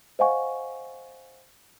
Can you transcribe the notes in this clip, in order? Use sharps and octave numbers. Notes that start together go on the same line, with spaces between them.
C5 D#5 F5 F#5 G#5 C#6